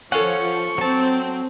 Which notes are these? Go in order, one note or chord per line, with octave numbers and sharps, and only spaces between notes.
F3 C#4 A4 C#5 F5 F#5 C#6
F#3 C4 A5